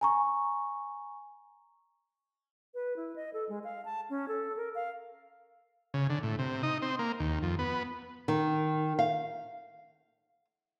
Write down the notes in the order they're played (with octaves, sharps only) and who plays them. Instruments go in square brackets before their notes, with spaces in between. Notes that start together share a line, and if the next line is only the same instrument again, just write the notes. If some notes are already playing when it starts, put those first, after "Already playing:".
[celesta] G#5 A#5 C#6
[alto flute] B4
E4
D#5
A4
G#3
F5
A5
C#4
A4
A#4
F5
[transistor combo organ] C#3
D3
A2
C3
D#4
C4
A#3
D#2
F2
B3
[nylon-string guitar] D#3
F5